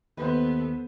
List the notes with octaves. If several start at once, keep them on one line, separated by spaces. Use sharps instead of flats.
D#2 B3 A4 B4 C5